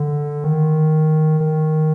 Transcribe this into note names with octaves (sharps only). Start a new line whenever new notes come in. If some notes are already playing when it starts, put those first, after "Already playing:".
Already playing: D3
D#3
D#3